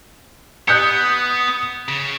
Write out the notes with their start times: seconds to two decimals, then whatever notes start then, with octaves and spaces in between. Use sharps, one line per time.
0.68 B3 D#6 F#6 G6 C#7
1.89 C#3